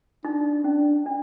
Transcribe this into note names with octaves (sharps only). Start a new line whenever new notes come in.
D4 D#4
C#4 D4
D4